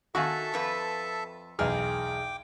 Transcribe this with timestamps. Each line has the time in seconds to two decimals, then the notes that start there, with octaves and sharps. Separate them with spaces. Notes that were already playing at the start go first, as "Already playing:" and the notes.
0.15 D#3 F#4 A4 E5 F5 G#5 A5 C#6
0.54 F2 B4
1.59 B1 E2 G#4 G5 D6 F6